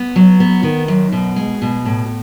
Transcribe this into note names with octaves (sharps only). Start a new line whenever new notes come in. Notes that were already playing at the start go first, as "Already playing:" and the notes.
Already playing: B3
F#3
B3
D#3
F#2
B2
G#3
B2
A2